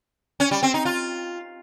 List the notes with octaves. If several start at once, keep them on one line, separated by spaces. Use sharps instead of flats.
C#4
G3
C4
D#4
F4